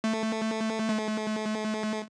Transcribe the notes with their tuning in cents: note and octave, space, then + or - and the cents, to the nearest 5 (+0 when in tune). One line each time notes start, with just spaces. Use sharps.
A3 +5
A3 -35